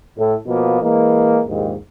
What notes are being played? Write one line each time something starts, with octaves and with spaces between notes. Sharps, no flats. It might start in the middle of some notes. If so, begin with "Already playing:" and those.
A2 A4
B2 F3 A#3 B3
E3 G#3 A#3
A#1 D#2 G#2